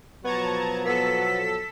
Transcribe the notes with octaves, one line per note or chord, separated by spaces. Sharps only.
B2 F3 F#3 B3 A5 A#5 C#6 G#6
B3 A4 E6 B6